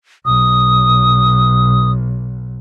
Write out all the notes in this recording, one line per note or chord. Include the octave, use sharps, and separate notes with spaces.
B1 D#6